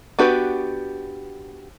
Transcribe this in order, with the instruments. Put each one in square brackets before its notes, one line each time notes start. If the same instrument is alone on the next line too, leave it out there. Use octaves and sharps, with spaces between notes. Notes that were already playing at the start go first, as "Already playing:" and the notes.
[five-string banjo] B3 D4 F#4 G4 B4